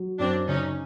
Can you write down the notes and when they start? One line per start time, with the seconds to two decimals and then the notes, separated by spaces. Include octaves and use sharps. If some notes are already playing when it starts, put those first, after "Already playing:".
Already playing: F#3
0.19 F#2 C4 D4
0.48 C#3 C#4 D#4